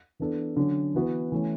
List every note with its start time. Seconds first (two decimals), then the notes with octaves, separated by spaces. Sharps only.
0.19 E3 B3 D4 A4
0.56 D3 F#3 C#4
0.95 E3 B3 F#4 B4
1.32 E3 A3 C#4